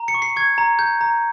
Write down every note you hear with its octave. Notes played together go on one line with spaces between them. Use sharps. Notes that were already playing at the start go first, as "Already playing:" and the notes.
Already playing: A#5
C#7
C#6
C7
C#6 G#6
A#5
G6
A#5